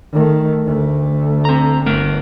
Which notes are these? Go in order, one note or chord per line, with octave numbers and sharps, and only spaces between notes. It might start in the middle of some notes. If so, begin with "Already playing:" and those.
D#3 A3
D2 A3
C4 A#5
G1 A3 B3 A#4